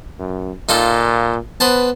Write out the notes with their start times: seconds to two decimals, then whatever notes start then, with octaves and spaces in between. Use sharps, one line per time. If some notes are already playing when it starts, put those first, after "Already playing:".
0.19 F#2
0.69 A#2 D#4 F4 A4
1.60 B3 B4 C5 A5